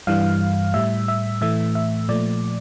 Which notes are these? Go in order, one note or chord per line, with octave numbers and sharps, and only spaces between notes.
G2 E3 G3 F5
A2 G3 E5
E5
A2 E3 A3 E5
E5
A#2 F3 A3 D5